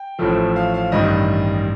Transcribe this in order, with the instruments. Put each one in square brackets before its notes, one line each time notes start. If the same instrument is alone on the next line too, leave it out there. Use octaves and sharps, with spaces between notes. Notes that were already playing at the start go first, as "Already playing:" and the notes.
Already playing: [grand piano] G5
A1 A2 F3 A3
F5
F5
A1 G2 D#3 G3 D#5